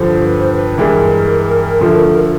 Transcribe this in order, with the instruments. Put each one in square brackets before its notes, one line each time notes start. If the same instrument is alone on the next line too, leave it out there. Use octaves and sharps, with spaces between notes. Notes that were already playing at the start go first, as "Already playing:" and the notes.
Already playing: [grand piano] G2 D3 F3 [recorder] C5
[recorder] B4
C5
B4
[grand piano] G2 E3 G#3 [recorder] A#4
[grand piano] D3 F3 A3
[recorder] A4